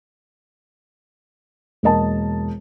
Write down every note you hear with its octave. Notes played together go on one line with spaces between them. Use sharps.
E1 A#3 A#4 D#5 A5